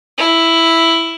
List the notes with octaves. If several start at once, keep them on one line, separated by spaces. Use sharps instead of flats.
E4